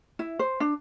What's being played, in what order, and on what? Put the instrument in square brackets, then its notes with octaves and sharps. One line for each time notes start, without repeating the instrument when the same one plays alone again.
[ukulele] E4
C5
D4